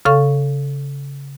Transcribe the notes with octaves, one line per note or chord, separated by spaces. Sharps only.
C#3 A4 F5 C#6